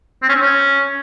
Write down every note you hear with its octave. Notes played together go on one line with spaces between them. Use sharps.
C4
C#4
C4
C#4